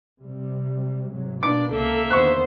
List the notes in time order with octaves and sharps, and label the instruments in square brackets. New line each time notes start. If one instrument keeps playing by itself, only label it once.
[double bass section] C3 G3
G#2 C3 F#3
[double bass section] B2 A#3 B3 [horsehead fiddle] D4 [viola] D5 [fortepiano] D6
[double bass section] C#2 C3 [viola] A#3 E5 [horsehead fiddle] A4
[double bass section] E2 D3 D#3 [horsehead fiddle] B3 C5 [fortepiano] C#6 F#6